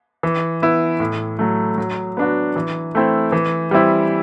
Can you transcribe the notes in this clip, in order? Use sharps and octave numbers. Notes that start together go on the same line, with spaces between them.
E3
B3 E4
A2
F#3 A3
F#3
B3 D4 F#4
E3
A3 C4 E4
E3
G3 C4 E4